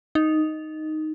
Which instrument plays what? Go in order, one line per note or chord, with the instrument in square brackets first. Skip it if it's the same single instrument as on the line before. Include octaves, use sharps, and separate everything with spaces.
[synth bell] D#4